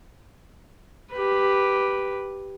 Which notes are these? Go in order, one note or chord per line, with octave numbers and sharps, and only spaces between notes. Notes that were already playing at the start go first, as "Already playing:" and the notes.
G4 B4